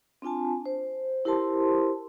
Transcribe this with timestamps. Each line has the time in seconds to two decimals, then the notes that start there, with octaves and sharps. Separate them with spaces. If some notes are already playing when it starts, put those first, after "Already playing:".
0.22 C4 D4 F4 G#5 A5
0.66 C5
1.25 E4 G4 A#4 C5 A5 C6